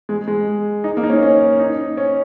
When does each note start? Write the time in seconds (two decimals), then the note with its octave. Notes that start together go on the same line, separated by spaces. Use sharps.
0.09 G#3
0.28 G#3
0.84 D#4
0.97 A#3
1.03 D#4
1.10 C#4
1.22 C#4
1.59 D#4
1.97 C#4